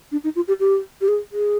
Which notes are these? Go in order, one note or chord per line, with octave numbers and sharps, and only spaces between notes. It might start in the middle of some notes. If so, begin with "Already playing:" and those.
D4
D#4
F4
G4
G4
G4
G#4
G#4